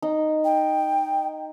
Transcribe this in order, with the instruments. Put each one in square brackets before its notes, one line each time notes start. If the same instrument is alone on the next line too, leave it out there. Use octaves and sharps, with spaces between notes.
[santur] D#4
[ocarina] G5